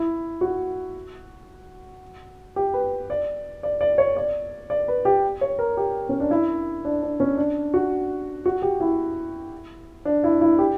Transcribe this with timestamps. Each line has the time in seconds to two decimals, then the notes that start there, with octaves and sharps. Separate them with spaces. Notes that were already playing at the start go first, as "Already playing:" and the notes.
Already playing: E4
0.41 F#4
2.56 G4
2.74 B4
3.10 D5
3.63 D5
3.81 D5
3.98 C#5
4.16 D5
4.70 D5
4.88 B4
5.05 G4
5.41 C#5
5.59 A#4
5.77 G4
6.09 C#4
6.20 D4
6.31 E4
6.85 D4
7.03 D4
7.20 C#4
7.37 D4
7.74 F#4
8.46 F#4
8.62 G4
8.80 E4
10.05 D4
10.24 E4
10.41 E4
10.59 G4